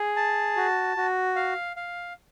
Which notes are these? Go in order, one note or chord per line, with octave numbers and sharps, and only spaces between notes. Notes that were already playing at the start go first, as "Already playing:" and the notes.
Already playing: G#4
A5
F#4
F#4
F5
F5